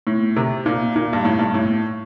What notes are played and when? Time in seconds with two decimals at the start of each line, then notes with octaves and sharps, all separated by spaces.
0.07 A2
0.36 C3
0.66 A#2
0.96 A#2
1.13 G2
1.25 A2
1.39 G2
1.54 A2